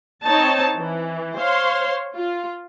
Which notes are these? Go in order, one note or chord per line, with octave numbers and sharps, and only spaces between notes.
C4 D#4 C#5 A5
E3
C5 C#5 F5 C6
F4